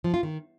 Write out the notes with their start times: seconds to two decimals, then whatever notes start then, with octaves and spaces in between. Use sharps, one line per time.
0.04 F3
0.14 F4
0.23 D#3